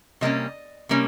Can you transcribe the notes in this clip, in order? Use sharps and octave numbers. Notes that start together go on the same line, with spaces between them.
C3 G3 A#3 C#4 D#5
C3 G3 A#3 C#4